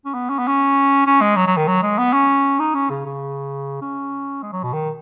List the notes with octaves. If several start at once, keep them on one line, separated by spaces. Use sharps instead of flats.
C#4
B3
C#4
B3
C#4
C#4
G#3
F#3
F#3
D#3
F#3
G#3
B3
C#4
D#4
C#4
C#3
C#3
C#4
G#3
F#3
B2
D#3